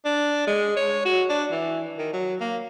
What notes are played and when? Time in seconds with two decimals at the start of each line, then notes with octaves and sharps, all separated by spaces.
0.05 D4
0.47 G#3
0.76 C#5
1.05 F#4
1.30 D4
1.51 E3
1.98 D#3
2.13 F#3
2.40 A#3